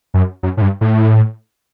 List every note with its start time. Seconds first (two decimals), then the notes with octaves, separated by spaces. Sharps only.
0.14 F#2
0.43 F#2
0.57 A2
0.62 G2
0.81 A2